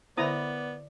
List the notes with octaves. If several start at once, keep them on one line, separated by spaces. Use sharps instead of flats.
D3 B3 E4 B4 C5 D5 A#5 D#6